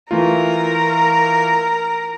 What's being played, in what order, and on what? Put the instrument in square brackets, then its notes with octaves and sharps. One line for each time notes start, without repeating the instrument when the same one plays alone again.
[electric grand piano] E3 A3 F4 [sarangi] A#4